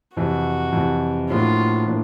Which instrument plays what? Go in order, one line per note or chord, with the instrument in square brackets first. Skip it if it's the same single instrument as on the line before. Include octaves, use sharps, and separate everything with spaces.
[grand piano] F2 C3 E3 [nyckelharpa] F#4
[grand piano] F2 C3 E3
[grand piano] A2 F3 A#3 D4 F#4 [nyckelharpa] F4
[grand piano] A2 F3 A#3 D4